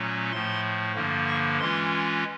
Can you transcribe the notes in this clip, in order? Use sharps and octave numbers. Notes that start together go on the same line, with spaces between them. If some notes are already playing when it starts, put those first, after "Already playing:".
Already playing: A#2 F#3 A3 C#4
A2 F3 A3 C6
G2 D3 F3 A#3
C#6
E3 G#3 C#4 F4 C6